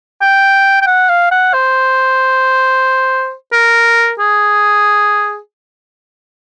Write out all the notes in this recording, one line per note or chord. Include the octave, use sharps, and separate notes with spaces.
G5
G5
F#5
F5
F#5
C5
A#4
G#4